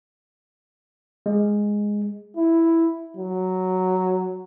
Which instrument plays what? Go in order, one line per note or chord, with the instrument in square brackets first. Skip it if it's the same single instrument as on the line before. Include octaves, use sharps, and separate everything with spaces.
[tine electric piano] G#3
[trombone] E4
F#3